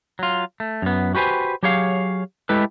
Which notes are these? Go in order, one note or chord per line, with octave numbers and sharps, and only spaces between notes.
F#3 F4
A3
F#2 B3
F#4 G4 B4 C5 G#5
F#3 G4 G#4 C#5 F5
G#3 A3 E4 G4 A4 B4